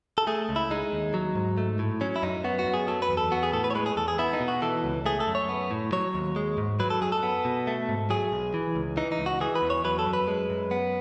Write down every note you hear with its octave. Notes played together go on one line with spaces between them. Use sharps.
A4
A3 G#4
C#2
E4
G#3 D#4
D#2
F#3
G#2
A3
A2
F#3 C#4
E4
F#2 D#4
B3 F#4
F#4
F#2
G#4
F#3 A4
B4
E2
A4
B3 F#4
G#4
A2 A4
B4
C#5
G#3 B4
G#4
E2 A4
G#4
B3 E4
D#4
B2
F#4
E3 A4
C#2
A3 G#4
A4
F#2
C#5
B3
A2
F#3 C#5
D#2
G#3
G#2
F#3 B4
A4
F#2 G#4
A4
B3
B2
A3
G#2
F#3 G#4
B1
E3
C#2
E3 D#4
D#4
C#2
F#4
E3 G#4
B4
E2
C#5
F#3 B4
A4
F#2
B4
G#3
F#2
B3